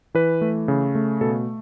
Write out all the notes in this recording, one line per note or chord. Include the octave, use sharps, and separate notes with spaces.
E3 B4
A3
C#3
A3
B2 A4